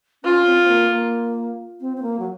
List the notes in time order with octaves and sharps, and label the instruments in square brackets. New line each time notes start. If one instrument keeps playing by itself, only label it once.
[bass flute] C#4 [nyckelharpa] F4
[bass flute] C4
A#3
A#3
C4
C4
A#3
F#3